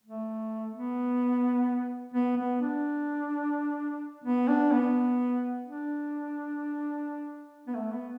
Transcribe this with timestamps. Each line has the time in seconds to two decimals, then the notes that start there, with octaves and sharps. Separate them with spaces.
0.03 A3
0.73 B3
2.14 B3
2.37 B3
2.61 D4
4.24 B3
4.48 D4
4.71 B3
5.65 D4
7.67 B3
7.75 A3
7.93 B3